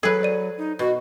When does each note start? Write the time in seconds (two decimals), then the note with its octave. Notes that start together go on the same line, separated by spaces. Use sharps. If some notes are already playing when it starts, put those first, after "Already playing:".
0.03 F#3 G#4 A4 B4
0.22 C5 D5 D#7
0.58 D#4
0.79 B2 F#4